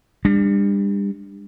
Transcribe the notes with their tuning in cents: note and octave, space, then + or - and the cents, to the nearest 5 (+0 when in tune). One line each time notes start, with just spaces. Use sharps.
G3 +35 D4 +15